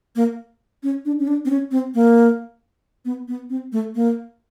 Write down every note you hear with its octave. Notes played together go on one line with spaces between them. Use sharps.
A#3
C#4
D4
C#4
D4
C4
C#4
C4
A#3
B3
B3
C4
A3
A#3